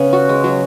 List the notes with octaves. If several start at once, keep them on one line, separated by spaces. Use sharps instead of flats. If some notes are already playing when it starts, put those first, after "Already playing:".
Already playing: C#3 B3 C#4 B4 C#5
F#4
G#3
F#3